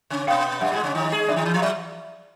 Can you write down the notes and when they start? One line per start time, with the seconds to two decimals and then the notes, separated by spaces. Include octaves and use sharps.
0.10 C#3 C#4
0.27 B2 B3 F5 G5
0.61 G2 G3 E5 F#5
0.72 G#2 G#3
0.83 C#3 C#4
0.95 D#3 D#4
1.12 G#3 G#4
1.28 D3 D4 D5 E5
1.36 D#3 D#4
1.45 E3 E4
1.54 F3 F4
1.62 F#3 F#4 D5 E5